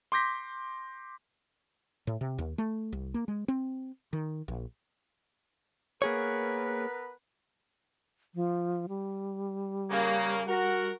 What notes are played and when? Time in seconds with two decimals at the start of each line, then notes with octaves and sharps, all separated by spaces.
0.12 C6 D6 G6 A#6 B6
2.07 A2
2.21 C3
2.38 D#2
2.58 A3
2.92 C2
3.14 A#3
3.28 G#3
3.48 C4
4.13 D#3
4.48 A#1
6.02 A#3 B3 G#4 A#4 B4 C#5
8.35 F3
8.89 G3
9.91 C#3 A#3
10.48 F#4 A#4 F#5